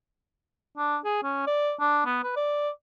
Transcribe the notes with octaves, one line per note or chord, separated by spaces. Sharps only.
D4
G#4
C#4
D5
D4
B3
B4
D5